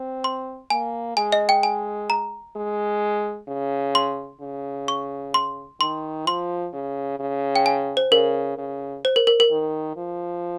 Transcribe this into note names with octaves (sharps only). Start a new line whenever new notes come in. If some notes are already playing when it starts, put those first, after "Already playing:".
Already playing: C4
C6
A#3 G#5
G#3 G#5
D#5
G5
G#5
A#5
G#3
C#3
C6
C#3
C#6
C6
D#3 C6
F3 C6
C#3
C#3
G5
G#5
C5
C#3 A#4
C#3
C5
A#4
A#4
A#4
D#3
F3